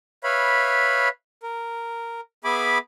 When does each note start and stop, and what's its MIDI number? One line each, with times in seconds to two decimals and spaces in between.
0.24 1.09 71
0.24 1.09 73
0.24 1.09 76
0.24 1.09 77
0.24 1.09 83
1.43 2.21 70
2.44 2.78 59
2.44 2.78 68
2.44 2.78 76
2.44 2.78 80
2.44 2.78 83
2.44 2.78 86